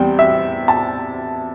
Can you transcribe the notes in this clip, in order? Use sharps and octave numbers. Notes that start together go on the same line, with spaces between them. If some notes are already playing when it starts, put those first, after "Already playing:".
Already playing: E2 G3 C4 G5
E5
A5